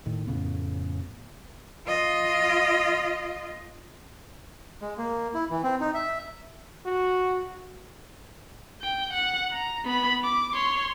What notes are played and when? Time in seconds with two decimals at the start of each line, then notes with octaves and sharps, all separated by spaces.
0.06 A2 D#3
0.27 F2 A2 C#3 B3
1.87 F4 D#5
4.81 G#3
4.98 A#3
5.34 E4
5.51 E3
5.63 C4
5.80 D#4
5.94 E5
6.86 F#4
8.82 G5
9.13 F#5
9.52 A#5
9.85 B3 B5
10.24 D6
10.54 C#5 C6